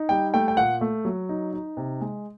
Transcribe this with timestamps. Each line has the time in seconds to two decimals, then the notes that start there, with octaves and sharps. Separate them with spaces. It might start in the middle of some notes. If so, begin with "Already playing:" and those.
Already playing: D#4
0.09 G3 G5
0.34 A3 G5
0.48 G5
0.57 A#2 F#5
0.81 A3
1.05 F#3
1.29 D#4
1.53 D#4
1.77 C3
2.01 G#3